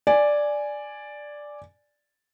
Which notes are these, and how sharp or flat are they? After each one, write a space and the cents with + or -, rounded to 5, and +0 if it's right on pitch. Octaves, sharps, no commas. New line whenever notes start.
D5 +0 G#5 +0